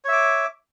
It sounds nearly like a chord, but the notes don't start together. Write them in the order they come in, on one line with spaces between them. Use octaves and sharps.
C#5 E5 D6